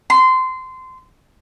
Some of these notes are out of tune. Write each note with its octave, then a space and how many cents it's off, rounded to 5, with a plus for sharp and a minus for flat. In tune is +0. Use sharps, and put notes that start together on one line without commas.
C6 -20